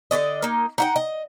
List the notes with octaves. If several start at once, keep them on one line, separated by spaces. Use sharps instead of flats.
D3 G4 D5 D#5
A#3 D#4
D#4 F#5 G5
D#5